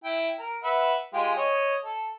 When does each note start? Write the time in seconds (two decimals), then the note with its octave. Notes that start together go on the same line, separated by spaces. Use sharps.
0.04 E4 G5
0.39 A#4
0.63 B4 E5 F#5
1.13 G#3 F4 G4
1.36 C#5 D#5
1.84 A4